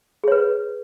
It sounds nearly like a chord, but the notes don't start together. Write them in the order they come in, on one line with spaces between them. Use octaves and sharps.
G#4 C#5 B4